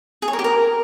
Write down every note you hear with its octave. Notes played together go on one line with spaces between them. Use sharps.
G#4
C#5
A#4
G4
A#4